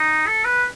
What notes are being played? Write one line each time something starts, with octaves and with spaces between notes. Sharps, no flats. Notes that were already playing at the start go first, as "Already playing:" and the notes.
Already playing: D#4
A4
B4